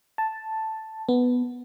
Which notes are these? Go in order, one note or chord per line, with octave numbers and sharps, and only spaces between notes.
A5
B3